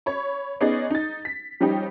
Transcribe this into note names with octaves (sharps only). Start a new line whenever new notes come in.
C#5 B5 C#6
B3 C#4 D#4 G#4 D5 D#5
D#4 A6
B6
F3 G3 C#4 D#4 G4